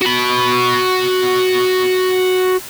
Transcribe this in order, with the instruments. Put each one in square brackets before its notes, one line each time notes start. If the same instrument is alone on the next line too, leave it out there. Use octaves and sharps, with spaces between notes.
[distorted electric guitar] F#4 B5